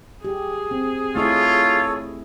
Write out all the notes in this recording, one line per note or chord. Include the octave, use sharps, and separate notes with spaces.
G4 G#4
C4
A3 E4 F4 A4 C#5 D#5